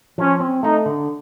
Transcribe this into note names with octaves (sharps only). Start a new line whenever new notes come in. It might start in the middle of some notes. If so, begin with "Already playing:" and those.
F3 C#4
C4
A3 D#4
D3